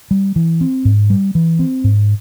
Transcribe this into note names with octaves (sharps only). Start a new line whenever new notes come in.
G3
E3
C4
G#2
G3
E3
C4
G#2